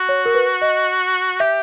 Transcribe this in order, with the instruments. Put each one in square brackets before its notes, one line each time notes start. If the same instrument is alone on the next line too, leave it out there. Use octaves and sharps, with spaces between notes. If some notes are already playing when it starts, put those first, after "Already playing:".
Already playing: [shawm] F#4
[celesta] C#5
A#4
B4
D#5
[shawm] G4 [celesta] E5